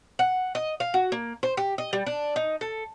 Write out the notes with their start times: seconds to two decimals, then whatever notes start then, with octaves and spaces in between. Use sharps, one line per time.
0.19 F#5
0.55 D#5
0.80 F5
0.94 F#4
1.12 A#3
1.43 C5
1.57 G4
1.78 D#5
1.93 G3
2.06 D4
2.36 D#4
2.61 A4